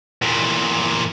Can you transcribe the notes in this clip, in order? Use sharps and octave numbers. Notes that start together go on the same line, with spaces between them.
E2 A#2